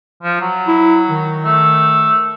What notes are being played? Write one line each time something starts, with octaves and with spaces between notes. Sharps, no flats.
F3
F#3
E4
D#3
A3